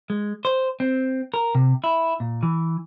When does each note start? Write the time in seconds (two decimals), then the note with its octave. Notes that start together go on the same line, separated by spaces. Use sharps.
0.10 G#3
0.45 C5
0.80 C4
1.34 A#4
1.55 C3
1.84 E4
2.20 A#2
2.43 E3